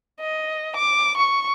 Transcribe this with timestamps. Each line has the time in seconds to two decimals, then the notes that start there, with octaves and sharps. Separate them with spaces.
0.20 D#5
0.76 D6
1.17 C#6